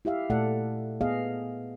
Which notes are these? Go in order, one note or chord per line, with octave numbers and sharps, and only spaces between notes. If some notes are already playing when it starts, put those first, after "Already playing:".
E4 G4 E5 F5
A#2 A3 A4 D5 F#5
B3 G#4 D#5 F5